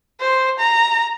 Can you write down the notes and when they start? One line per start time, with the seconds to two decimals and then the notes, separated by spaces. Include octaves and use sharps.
0.21 C5
0.59 A#5